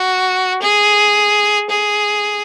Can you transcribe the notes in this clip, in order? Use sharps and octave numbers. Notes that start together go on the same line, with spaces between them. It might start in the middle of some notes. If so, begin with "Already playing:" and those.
Already playing: F#4
G#4
G#4